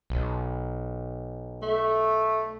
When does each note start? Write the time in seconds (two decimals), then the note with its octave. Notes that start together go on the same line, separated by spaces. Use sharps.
0.10 B1
1.62 A3